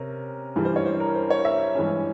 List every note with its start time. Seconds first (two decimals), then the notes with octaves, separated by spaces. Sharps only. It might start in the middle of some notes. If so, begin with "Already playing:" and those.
Already playing: C3 C#4 A#4
0.56 G2 E3 G3
0.65 C5
0.76 C#5
0.86 C5
1.00 A#4
1.15 C5
1.30 C#5
1.45 E5
1.75 G2 E3 G#3 C#4